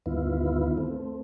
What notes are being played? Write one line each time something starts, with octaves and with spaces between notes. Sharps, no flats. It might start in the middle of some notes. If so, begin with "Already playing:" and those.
D2 G2 D#3 B3 E4 F4
A3 C4